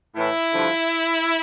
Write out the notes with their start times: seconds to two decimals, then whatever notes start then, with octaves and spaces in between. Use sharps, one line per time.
0.14 A2 E3 E4
0.53 G2 D3 F3